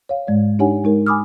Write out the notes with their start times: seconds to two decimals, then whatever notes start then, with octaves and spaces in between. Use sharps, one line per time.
0.09 C#5 F5
0.27 G#2 G#3 D5
0.59 D4 D#4 G4 C#5 F#5 G#5
0.84 G#3 D#4 A#4
1.07 G#5 B5 D6 D#6 F6